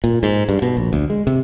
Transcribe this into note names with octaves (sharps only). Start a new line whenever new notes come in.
A#2
G#2
G2
B2
A#1
D2
G#3
C3